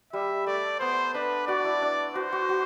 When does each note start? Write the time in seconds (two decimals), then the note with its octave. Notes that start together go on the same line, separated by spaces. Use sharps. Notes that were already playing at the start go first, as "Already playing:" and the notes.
0.13 G3 E5
0.47 A3 D5
0.80 B3 C5
1.14 D4 B4
1.47 F#4 D5
1.65 E4
1.82 D4
2.15 F#4 C5
2.32 F#4
2.49 F#4